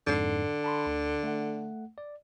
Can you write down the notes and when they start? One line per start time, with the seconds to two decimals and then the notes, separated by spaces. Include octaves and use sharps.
0.07 F2 G#2 D3 C7
0.64 A5 B5 C6
0.86 D2
1.23 A3 F#5
1.98 D5